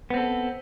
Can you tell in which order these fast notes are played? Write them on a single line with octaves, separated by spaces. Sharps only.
B3 C4 A4